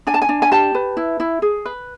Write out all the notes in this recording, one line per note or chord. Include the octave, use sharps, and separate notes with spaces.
D4 G#5
A5
G#5
D4
G#5
G4 A5
B4
E4
E4
G#4
B4